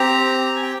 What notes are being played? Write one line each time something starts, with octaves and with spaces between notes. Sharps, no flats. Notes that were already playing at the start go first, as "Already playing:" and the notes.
Already playing: C4 G4 A#5
G#5
G5